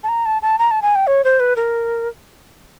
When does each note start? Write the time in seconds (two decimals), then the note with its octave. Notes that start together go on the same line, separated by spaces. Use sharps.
0.03 A5
0.08 A#5
0.26 A5
0.42 A5
0.59 A#5
0.71 A5
0.82 G#5
0.95 G5
1.07 C#5
1.24 C5
1.40 B4
1.56 A#4